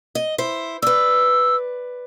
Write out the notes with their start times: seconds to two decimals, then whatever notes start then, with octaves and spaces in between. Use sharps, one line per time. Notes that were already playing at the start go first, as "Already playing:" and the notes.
0.15 D#5
0.38 E4 C5
0.82 B4 D5 E6